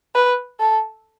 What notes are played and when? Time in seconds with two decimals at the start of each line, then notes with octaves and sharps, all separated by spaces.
0.15 B4
0.60 A4